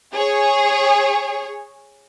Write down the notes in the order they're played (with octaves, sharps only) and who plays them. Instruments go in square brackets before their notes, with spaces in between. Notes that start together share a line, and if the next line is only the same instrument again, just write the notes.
[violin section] G#4 C#5